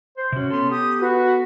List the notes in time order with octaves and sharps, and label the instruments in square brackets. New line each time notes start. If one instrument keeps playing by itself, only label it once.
[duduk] C5
[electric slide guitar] C3 F#4 [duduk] C#4
[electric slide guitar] B3 A4 [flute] C6
[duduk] G4 [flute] D#6
[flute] F#4 [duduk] B4